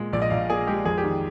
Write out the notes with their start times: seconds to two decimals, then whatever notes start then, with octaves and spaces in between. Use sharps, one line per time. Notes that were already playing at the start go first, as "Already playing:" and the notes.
Already playing: A#2 G#3
0.13 A#1 D5
0.22 D#5
0.30 A#1 F5
0.49 A#2 G#4
0.67 G#3 G4
0.85 F2 G#4
0.98 G4
1.04 D#3